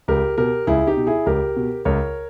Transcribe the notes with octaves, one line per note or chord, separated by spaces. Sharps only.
C#2 G4 A#4
B2 G4 A#4
C#2 E4 G#4
D#4 G4
B2
E4 G#4
C#2 G4 A#4
B2
C#2 A#4 C#5